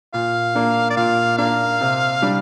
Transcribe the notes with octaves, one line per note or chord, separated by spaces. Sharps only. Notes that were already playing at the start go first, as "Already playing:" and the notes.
A#2 F5
A#3 D4
D5
A#2 F5
A#3 D4 F5
C3
G3 D4